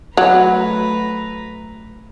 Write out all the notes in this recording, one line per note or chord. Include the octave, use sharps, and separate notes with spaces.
F#3 A3 B4 A#5